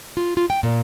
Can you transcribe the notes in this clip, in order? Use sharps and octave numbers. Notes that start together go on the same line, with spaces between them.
F4
F4
G5
A#2